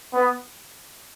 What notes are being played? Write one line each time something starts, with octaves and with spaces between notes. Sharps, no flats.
B3